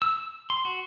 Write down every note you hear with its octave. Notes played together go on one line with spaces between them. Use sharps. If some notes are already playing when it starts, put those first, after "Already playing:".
E6
C6
F#4